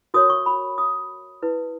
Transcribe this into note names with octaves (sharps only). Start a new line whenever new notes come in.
F#4 A#4 C#5 D#6
C#6
B5
D#6
E4 B4